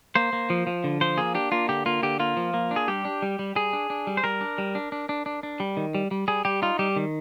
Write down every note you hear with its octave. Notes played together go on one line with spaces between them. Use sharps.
A#3 C5
A#3
F3
F3
D3
F3 C5
A#3 G#4
D4 G4
A#3 F4
D3 G4
A#3 F4
D3 G4
A#3 F4
F3
A#3
D4
G#4
G3 G4
D4
G3
G3
G3 G#4
D4
D4
G3
C5
G3 A#4
D4
G3
D4
D4
D4
D4
D4
G3
D#3
G3
G3
G3 G#4
G3 G4
D#4 F4
G3 G4
D#3